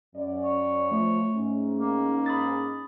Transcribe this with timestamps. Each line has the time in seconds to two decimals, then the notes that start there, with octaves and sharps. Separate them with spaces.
0.14 F#2 C#4 D5
0.44 C#5
0.91 F3 A3
1.35 G#2 C#4
1.79 A#3
2.26 B5 D#6 A6